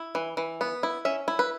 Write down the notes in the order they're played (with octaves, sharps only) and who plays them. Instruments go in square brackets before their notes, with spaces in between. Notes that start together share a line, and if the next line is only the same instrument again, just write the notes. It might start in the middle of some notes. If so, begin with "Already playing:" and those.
Already playing: [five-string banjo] E4
E3
E3
B3
E4
C#4 E5
E4
B4